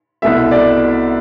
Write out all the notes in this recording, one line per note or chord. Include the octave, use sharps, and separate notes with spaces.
C2 B2 A3 E5
D5